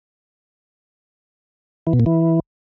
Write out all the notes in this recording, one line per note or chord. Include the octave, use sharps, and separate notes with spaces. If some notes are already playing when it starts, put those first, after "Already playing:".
E3
B2
A#2
E3